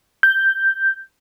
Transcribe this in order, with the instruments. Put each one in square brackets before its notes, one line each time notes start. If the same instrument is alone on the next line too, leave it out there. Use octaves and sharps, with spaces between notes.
[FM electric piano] G6